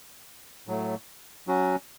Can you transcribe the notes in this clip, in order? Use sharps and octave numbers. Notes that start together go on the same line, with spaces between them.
A2 F#3 A3
F#3 C#4 F#4